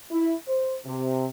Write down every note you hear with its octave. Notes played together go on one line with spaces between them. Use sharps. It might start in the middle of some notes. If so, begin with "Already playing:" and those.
E4
C5
C3